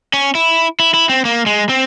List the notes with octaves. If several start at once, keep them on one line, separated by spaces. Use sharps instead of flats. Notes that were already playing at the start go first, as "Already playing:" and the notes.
C#4
E4
E4
E4
C4
A#3
G#3
C4